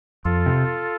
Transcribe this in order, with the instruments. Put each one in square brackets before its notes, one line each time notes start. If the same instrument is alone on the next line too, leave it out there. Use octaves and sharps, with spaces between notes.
[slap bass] F2 [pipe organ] F4 A4
[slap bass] C3